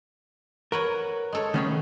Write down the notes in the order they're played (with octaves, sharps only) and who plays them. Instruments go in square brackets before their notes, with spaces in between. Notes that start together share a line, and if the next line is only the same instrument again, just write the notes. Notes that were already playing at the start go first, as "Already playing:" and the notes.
[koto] F#4 B4 C#5 [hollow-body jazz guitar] A#4
[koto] G#3 A4 C#5
[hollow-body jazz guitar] D#3 A3 C#4 [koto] B3 G#4 C#5